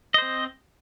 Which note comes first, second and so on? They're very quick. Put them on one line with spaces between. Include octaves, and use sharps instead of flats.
D#5 C5 C4